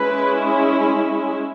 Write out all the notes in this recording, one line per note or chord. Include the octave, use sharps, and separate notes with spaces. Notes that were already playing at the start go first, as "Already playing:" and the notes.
Already playing: G#3 C#4 E4 B4